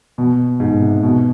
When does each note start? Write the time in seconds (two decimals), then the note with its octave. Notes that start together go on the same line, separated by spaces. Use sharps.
0.18 B2
0.60 G#2
0.81 C3
1.03 B2